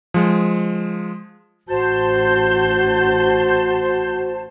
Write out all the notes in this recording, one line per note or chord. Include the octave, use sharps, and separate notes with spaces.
F3 G#3
A1 F#4 C5 A5 G6